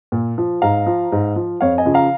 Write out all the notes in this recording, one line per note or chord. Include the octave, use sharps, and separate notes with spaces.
A#2
F3
G#2 F5 A#5
F3
G#2
F3
F2 C#5 F5
D#5 G#5
C#3 F3
F5 A#5